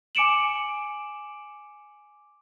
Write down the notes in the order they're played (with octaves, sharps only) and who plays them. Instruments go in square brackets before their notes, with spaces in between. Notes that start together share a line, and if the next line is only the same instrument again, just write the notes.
[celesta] G#5 D6 C#7 D7 E7 F#7